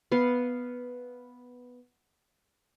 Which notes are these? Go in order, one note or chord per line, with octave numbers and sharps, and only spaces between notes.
B3 B4 F5